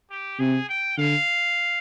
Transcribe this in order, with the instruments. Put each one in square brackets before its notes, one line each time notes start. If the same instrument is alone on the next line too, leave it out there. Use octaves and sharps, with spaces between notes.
[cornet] G4
[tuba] C3 [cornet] G#4
[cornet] G5
[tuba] D3 [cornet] F5